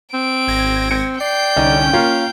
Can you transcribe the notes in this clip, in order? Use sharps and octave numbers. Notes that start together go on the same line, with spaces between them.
C4 D7
G#1 G#6 A#6
C4 C#7
D5 G5 G6 C7
C2 D3 C#4 D#4 D#5
A#3 C#4 F4 F5